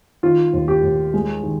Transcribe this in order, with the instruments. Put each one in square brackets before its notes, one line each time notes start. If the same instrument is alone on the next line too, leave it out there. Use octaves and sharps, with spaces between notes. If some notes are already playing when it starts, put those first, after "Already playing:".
[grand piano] D#3 F4
D#2
G4
D#2
G#3
D#3